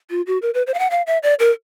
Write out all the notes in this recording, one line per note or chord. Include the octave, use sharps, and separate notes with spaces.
F4
F#4
A#4
B4
C5
F5
F#5
F5
E5
D5
A#4